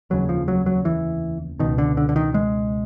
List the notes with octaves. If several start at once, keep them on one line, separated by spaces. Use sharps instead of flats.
F1 D#2 C#3 F#3
F3
F#3
F#3
E3
C#2 B2 D#3
D3
D3
D3
D#3
G#3